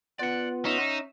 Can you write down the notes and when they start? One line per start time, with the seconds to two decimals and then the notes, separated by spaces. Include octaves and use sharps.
0.19 B3 F4 B4 D5 F#5
0.65 C#4 D#4 E5